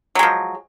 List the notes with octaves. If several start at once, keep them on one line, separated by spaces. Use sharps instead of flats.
F3 F#3 G#3